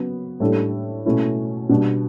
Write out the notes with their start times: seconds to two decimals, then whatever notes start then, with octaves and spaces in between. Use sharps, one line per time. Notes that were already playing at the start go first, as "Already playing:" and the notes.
Already playing: C#3 F#3 B3
0.40 A2 G3 D4 A4
1.06 B2 A3 C#4 E4
1.69 B2 G3 D4